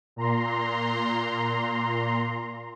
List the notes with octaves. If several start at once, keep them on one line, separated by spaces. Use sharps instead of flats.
A#2 A#5 C6